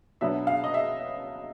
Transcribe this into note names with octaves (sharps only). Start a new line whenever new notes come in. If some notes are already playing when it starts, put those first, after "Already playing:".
B2 F#3 B3 D4 E5
F5
D#5
E5